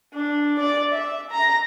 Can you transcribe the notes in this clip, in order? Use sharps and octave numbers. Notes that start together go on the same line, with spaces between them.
D4
D5
E5
A#5